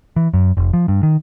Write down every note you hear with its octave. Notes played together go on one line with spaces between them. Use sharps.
E3
F#2
F1
F3
G2
D#3